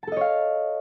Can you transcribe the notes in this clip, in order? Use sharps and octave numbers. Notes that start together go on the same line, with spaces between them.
A4 C#5 D#5 F5 A5